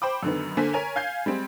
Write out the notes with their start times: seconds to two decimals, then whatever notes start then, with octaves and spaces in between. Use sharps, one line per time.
0.02 C5 G5 B5 D6
0.23 F#2 D3 D#3 B3
0.57 D3 A#3 C5 G#5 B6
0.73 A#4 C#5 G#5 F7
0.96 F5 G#5 G6 G#6 C7
1.26 G3 G#3 C4